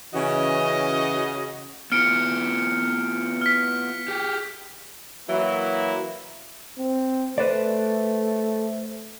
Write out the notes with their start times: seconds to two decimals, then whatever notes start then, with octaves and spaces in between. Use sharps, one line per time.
0.14 C#3 E3 C#4 F#4 D#5
1.92 B3 E4 F4 F6 C#7 D7
3.41 F6 B6
4.08 G4 G#4 G5
5.29 E3 F#3 A#3 E4
6.79 C4
7.38 A3 B4 C5 D5